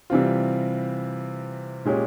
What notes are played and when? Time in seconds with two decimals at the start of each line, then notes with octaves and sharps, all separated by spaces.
0.10 C3 E3 G3 C4 F4
1.85 A#2 G#3 C#4 G4 C#5